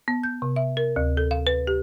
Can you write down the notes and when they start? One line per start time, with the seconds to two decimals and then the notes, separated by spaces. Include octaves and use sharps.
0.08 B3
0.23 G6
0.42 C3
0.56 E5
0.77 A#4
0.96 D2
1.17 A4
1.31 F5
1.47 B4
1.67 G4